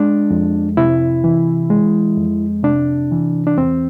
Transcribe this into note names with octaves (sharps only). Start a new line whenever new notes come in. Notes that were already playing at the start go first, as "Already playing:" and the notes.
Already playing: G#3 D4
F2
C3 E4
E3
G#3
F2
C3 D4
E3
D4
E2 C4